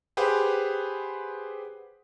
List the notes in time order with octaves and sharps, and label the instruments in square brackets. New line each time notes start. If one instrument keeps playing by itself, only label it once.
[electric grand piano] G4 G#4 B4 C5 F#5